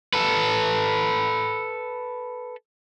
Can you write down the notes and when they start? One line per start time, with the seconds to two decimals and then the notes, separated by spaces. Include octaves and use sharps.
0.13 A4 B4